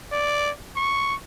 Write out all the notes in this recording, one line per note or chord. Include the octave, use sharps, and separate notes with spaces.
D5
C#6